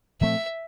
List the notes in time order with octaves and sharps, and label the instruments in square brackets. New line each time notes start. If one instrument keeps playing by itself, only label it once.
[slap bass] A#2 F3 A3 C4 [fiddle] E5